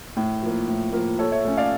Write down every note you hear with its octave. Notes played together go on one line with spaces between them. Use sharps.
A2
F3 A#3
A2
F3 A#3
A#2 A4 C#5
C#5 E5
A3 C#4
D5 F5